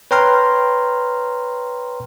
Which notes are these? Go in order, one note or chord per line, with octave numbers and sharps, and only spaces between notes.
B4 C#5 G5 A#5 C6 F6